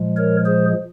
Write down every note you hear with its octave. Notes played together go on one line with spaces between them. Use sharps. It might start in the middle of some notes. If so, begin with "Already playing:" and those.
Already playing: A#2 F3 G#3
A#4 C#5
G#4 C5